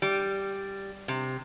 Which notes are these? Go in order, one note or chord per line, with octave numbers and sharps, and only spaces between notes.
G3
C3